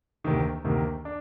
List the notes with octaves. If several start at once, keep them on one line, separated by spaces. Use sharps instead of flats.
D2 C3 D#3 A#3
D2 C3 D#3 A#3
D4